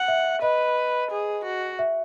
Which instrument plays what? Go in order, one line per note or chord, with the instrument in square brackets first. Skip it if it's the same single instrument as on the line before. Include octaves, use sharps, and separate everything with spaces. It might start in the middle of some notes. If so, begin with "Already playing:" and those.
Already playing: [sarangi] F#5
[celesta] E5
[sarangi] B4 [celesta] D#5
[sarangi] G#4
F#4
[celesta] E5